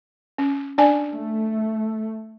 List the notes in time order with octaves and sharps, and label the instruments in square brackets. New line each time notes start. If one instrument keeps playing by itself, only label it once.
[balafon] C#4
D4 D5 G#5
[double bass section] A3